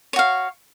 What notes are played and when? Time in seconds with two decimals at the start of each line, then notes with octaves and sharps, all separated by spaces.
0.13 C#5
0.16 F#4
0.19 F5